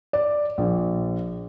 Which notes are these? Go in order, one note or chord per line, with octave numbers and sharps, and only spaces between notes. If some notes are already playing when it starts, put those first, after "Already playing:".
D5
A#1